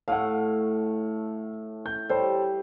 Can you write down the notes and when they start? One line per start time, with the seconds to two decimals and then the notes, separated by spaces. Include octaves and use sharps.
0.08 A2 A3 F5 F#5
1.86 G6
2.09 G3 A4 C5 C#5